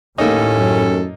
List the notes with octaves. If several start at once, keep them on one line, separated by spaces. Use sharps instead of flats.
D#2 A2 A#3 C#4 D#4 A4
F#2